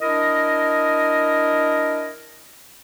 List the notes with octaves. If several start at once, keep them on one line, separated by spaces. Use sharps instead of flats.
D4 E4 A#4 D#5